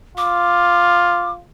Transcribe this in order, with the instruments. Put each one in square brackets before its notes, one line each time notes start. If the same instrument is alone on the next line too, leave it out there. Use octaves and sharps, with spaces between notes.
[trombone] F4 [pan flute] D6